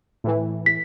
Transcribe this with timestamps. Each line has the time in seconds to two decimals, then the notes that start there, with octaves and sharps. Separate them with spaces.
0.24 A2 E3
0.66 B6